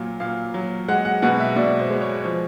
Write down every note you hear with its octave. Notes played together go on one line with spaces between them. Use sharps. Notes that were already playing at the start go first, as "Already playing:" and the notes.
Already playing: A#2 F#3 F5
A#2 F5
F#3
G#3 F#5
F#5
B2 F#5
E5
B2 D5
C5
G#3
C#5
F3